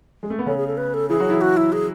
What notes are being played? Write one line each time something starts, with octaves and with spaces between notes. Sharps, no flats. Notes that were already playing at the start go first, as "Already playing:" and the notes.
G#3
A3
B3
C#3 C#4 A4
G#4
A4
B4
A4
E3 E4 G#4
F#3 F#4
E3 E4
F#4
E4
G#4